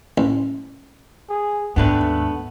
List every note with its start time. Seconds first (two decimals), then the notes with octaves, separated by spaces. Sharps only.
0.18 A1
1.29 G#4
1.76 D#2 G#2 A3 B3 D4 B4